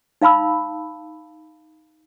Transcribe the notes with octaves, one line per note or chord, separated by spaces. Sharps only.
D#4 F5 A5 B5 E6